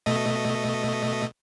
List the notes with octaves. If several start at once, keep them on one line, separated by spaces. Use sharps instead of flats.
B2 A3 D#5